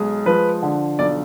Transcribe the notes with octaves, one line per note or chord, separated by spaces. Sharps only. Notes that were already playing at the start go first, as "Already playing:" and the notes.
Already playing: B1 G#3
F3 B4
D3
B1 D5